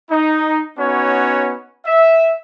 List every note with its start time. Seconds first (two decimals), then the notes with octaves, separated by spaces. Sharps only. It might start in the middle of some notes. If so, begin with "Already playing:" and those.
0.11 D#4
0.78 B3 C#4 D#4 F#4 C#5
1.86 E5